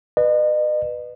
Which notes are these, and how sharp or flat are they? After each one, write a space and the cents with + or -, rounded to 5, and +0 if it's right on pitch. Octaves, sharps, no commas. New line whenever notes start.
B4 +0 D#5 -40